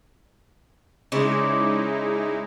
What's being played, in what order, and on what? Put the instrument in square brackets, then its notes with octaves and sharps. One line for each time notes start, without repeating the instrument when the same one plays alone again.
[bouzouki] C#3 C5 D5 [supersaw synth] G#3 D#4 E4